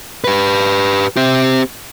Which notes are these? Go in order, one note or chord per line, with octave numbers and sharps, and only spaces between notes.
G4 B4
C4 G4